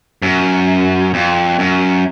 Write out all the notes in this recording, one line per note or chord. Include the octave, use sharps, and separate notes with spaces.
F#2
F2
F#2